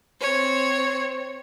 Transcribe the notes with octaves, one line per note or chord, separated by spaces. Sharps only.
C4 C#5